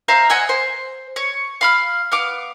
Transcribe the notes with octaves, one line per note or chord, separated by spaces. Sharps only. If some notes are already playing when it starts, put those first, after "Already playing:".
C5 E5 F5 A#5
D#5 F#5 G#5 E6
C5
C#5
F5 B5 F6
B3 F5 D6